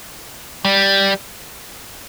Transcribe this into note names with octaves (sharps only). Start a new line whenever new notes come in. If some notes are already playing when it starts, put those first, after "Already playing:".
G3